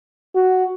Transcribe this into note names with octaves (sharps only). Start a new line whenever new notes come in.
F#4